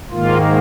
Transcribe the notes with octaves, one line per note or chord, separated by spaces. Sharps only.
G#2 D#3 A#3 F4